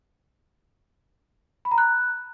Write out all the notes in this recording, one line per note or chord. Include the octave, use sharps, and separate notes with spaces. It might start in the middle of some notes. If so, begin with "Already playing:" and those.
B5
A#5
F#6